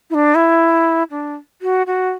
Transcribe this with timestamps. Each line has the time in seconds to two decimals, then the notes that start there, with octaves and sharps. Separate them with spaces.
0.10 E4
0.14 D4
0.35 E4
1.11 D4
1.62 F#4
1.87 F#4